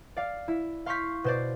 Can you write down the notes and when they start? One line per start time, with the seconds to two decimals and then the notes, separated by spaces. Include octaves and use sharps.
0.16 D5 F5
0.48 E4
0.86 F5 C6 C#6 G6 B6
1.24 B2 C5 D5